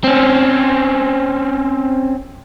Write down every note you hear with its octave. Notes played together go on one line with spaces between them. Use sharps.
C4 C#4